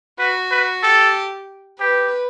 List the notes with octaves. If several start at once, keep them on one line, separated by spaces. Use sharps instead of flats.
F#4 B4
B4
G4 A4
G4 B4